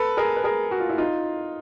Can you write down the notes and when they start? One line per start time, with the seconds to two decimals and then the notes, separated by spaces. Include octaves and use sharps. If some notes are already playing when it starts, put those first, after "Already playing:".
Already playing: A4 B4
0.17 G#4 A#4
0.36 B4
0.44 G#4 A#4
0.71 F#4
0.80 F4
0.89 E4
0.98 D#4 F4